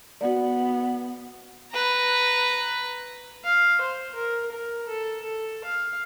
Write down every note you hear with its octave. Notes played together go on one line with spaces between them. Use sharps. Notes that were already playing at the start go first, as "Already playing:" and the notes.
B3 F#4 D5
B4 A#5
F5
C5
A#4
A#4
A4
A4
F5